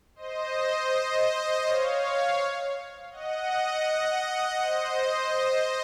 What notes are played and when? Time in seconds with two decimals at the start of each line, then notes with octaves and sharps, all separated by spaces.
0.16 C5 D#5
1.63 C#5 F5
3.11 D#5 F#5
4.59 C5 D#5